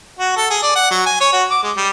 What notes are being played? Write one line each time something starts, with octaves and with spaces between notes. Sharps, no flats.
F#4
A4
G#4
D5
F#5
F#3
G#5
C#5
F#4
D6
G#3
G3